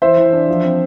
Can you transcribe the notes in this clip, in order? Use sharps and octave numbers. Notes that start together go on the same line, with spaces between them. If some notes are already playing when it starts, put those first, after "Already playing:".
E3 C5 E5
E3
D4
F3
C4